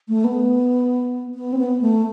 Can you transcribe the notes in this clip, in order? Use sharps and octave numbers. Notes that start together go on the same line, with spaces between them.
A3
B3
B3
C4
B3
A3